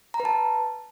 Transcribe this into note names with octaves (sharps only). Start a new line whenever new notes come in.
A#5
B4
A5